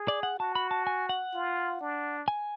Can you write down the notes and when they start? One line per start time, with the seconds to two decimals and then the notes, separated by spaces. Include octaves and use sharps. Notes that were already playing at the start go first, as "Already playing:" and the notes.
Already playing: G#4
0.08 D5
0.23 F#5
0.39 F#4 A5
0.55 B5
0.71 A5
0.87 G#5
1.09 F#5
1.34 F4
1.81 D4
2.28 G#5